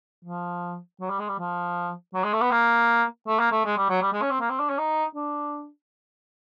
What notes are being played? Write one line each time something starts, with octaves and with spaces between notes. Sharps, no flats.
F3
F#3
G3
G#3
G3
F3
F#3
G#3
A3
B3
A#3
A3
A#3
A3
G#3
G3
F#3
G3
G#3
C#4
C4
A#3
C4
D4
C#4
D#4
D4